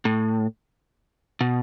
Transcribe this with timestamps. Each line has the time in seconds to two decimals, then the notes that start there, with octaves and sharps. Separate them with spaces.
0.05 A2
1.41 B2